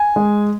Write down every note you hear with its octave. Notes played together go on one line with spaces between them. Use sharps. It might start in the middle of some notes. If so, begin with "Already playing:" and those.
Already playing: G#5
G#3